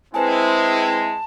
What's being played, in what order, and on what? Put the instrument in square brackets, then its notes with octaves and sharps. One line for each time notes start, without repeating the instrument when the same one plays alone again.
[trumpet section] G#3 [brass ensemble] C4 E4 [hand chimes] B4 C5 G#5 [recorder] A5